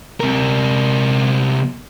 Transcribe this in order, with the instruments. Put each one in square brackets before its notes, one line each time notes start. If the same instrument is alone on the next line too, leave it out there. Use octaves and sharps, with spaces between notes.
[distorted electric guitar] C3 A#4